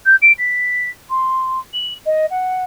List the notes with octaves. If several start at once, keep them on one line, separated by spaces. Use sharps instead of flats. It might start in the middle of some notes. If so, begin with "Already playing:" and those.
G6
D7
B6
C6
F#7
D#5
F#5